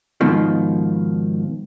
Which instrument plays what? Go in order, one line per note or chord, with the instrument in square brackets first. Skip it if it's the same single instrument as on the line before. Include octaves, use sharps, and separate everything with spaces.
[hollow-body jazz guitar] G#2 B2 D#3 F3